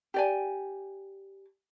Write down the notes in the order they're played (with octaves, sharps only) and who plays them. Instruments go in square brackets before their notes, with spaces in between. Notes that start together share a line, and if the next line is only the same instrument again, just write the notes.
[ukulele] G4 D5 G#5